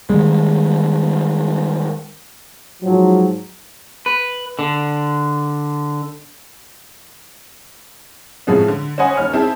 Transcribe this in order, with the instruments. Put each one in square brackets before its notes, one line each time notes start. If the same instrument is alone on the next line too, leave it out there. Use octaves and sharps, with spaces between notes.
[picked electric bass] D#3 E3 G3 G#3
[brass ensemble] G#2 F3 F#3
[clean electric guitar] B4
D3
[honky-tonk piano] A2 C3 F3 G#3 A3 B3
D3
C#4 C5 D#5 F#5 G#5 B5
D#2 C#4 F6
C4 E4 G#4 A5